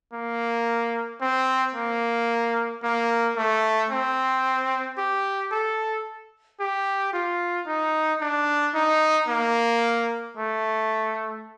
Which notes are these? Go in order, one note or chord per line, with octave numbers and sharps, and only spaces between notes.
A#3
C4
A#3
A#3
A3
C4
G4
A4
G4
F4
D#4
D4
D#4
A#3
A3